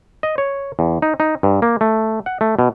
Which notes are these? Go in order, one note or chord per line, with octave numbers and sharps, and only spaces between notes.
D#5
C#5
E2
D#4
D#4
G2
A#3
A3
F#5
A3
B2